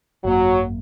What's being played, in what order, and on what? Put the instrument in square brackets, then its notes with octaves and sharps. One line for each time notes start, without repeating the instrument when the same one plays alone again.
[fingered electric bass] G#1 F#2 A#3 [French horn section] F#3